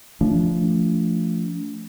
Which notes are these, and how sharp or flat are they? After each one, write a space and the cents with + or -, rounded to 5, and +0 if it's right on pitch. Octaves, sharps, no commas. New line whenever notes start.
F3 -25 A3 +0 D4 -40